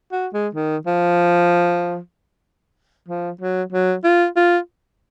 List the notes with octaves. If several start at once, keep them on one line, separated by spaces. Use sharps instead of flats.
F#4
G#3
D#3
F3
F3
F#3
F#3
F4
F4